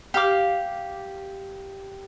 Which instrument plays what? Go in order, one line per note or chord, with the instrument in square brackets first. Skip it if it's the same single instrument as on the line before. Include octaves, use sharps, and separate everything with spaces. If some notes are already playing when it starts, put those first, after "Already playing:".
[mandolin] G4 F5 D6